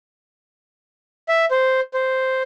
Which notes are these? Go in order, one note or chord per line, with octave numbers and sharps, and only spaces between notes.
E5
C5
C5